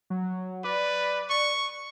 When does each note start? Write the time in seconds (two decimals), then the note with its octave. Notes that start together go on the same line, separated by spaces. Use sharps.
0.10 F#3
0.64 B4 D5
1.30 C#6